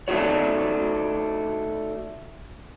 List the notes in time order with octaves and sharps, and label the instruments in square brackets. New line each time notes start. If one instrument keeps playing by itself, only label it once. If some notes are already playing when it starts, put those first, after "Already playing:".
[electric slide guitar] A3 D4 D#4 F#4 C#5